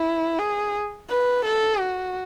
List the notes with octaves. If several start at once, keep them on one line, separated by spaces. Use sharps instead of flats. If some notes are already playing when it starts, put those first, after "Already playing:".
Already playing: E4
G#4
B4
A4
F#4